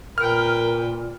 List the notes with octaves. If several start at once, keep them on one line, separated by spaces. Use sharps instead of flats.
A#2 A#4 B4 G5 F6